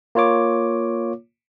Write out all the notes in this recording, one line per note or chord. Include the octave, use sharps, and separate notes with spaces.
A#3 F4 C#5 D6